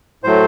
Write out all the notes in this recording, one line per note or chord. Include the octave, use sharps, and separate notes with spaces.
A2 F#3 A3 C5